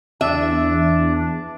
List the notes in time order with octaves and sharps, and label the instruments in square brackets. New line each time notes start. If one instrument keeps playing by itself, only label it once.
[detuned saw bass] E2 [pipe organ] D4 [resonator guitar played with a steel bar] E5